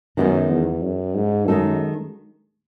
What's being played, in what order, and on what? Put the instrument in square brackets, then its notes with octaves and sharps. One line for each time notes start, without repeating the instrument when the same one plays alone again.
[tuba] F#2 [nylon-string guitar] D#3 G#3 B3
[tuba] E2
F#2
G#2
[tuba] F#2 [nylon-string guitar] D#3 G#3 D#4 A4